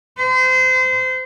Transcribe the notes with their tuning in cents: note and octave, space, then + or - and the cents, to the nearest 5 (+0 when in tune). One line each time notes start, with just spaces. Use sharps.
C5 -30